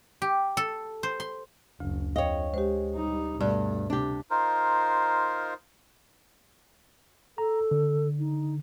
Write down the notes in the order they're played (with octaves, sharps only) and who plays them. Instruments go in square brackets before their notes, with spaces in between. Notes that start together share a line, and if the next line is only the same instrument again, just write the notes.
[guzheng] G4
A4
C5
C6
[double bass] F#1 [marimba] D2
[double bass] F2 [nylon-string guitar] C#5 D#5 [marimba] F5 G5
[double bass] G#3 [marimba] G4 C5
[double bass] G3 D#4
[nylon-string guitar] G2 [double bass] B2 A3 [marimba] D5
[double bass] C3 [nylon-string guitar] D4 G4
[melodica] D#4 F4 A#4 C5
[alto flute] A4 [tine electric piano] A#5
[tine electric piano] D3
[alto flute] D#4